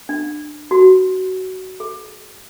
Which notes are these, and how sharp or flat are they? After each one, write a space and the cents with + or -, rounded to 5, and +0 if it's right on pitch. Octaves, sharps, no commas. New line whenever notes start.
D4 +25
F#4 +15
G#4 +35